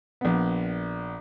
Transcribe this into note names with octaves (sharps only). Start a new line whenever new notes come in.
A#1 B3